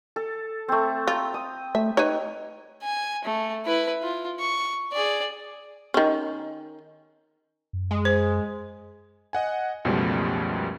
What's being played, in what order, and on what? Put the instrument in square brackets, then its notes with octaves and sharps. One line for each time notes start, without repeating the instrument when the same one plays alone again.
[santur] A4
A3 C4
[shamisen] F4 [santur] A#5
[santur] D#6
[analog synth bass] A3 [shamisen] E5
[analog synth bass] D#4 [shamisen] B4 C#5
[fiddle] G#5
A3
E4 B4
F4
C#6
G#4 D5
[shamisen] D#3 C#4
[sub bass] F#2
[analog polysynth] G#3
[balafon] C5
[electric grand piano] D#5 F#5 G#5
C#2 F#2 B2 F3 G3 A3